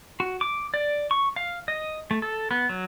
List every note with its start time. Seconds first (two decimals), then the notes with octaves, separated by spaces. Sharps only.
0.20 F#4
0.41 D6
0.74 D5
1.11 C#6
1.36 F5
1.68 D#5
2.11 A3
2.22 A4
2.51 B3
2.69 F#3